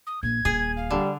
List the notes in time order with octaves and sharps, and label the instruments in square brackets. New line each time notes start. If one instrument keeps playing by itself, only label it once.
[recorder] D#6
[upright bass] A#1 [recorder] G#6
[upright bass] D#1 F4 [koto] G#4
[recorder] F5
[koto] D3 [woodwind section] G3